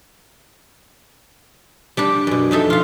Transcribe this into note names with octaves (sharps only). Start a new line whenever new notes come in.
G3 D4 G4 D5
F#2 B2
F2 D#4 A4 E5
F4 F5